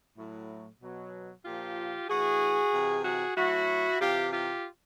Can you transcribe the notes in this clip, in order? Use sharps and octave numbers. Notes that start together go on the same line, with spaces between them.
A2 F#3
B2 F#3
A#2 F3 F4 G4
A2 E3 F#4 G#4
C3 E3
F#4 G#4
A2 F#3 E4 F#4
C3 E3 F4 G4
F4 G4